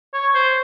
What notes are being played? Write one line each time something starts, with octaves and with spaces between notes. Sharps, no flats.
C#5
C5